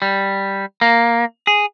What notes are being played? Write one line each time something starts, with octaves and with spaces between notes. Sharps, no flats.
G3
A#3
G#4